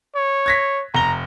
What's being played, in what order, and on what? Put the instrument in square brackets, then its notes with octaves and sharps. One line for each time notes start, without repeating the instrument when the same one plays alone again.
[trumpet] C#5
[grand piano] G#6 A#6 B6
[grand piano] F1 G7 [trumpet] A#5